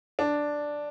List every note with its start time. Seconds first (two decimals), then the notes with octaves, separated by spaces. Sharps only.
0.19 D4